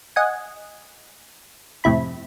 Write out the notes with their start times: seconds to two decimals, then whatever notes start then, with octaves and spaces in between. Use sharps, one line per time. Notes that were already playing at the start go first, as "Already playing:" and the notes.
0.16 D#5 F#5 G#5
1.84 F2 A2 C3 E4 B5